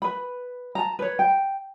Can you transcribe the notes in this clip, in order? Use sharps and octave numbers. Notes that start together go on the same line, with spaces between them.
B4 B5
A5 A#5
B4 C#5
G5